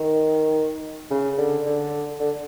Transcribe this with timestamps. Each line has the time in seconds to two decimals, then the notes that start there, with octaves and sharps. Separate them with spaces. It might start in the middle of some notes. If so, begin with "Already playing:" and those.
Already playing: D#3
1.11 C#3
1.38 D3
1.66 D3
2.20 D3